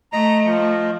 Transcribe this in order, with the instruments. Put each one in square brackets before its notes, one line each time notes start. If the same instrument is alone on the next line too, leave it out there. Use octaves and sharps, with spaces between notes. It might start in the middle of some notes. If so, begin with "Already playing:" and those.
[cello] A3 [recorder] D#5 [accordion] A#5
[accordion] F3